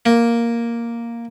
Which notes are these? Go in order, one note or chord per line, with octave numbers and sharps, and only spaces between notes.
A#3